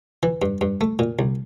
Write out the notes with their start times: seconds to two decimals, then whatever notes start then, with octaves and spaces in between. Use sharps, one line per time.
0.23 E3
0.42 G2
0.61 G2
0.81 A3
0.99 A#2
1.19 C2